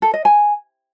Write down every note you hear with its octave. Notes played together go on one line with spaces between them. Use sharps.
A4
D#5
G#5